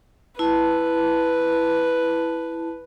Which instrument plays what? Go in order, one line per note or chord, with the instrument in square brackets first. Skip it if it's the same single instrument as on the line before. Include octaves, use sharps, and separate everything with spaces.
[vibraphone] E4 A5 [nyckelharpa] B4